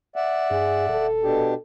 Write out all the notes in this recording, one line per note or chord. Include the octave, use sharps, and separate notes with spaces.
D5 E5 F#5
G2 G#4
D#1 A4
B2 D4 G4